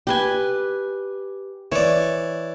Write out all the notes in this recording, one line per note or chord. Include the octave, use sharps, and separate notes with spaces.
G4 B4 G#5
E3 C#5 D5